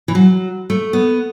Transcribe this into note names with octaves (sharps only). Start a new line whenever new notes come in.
E3
F#3
A3
B3